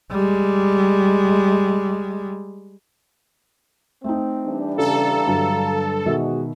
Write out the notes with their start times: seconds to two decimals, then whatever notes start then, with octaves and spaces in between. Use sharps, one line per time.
0.11 G3 G#3
4.04 A3 C4 D#4
4.45 E3 G3 D4
4.78 C#3 G4 A4 F5 A#5
5.27 G2 D3 F#3
6.06 E2 B2 D#3 G#3 F#4 E5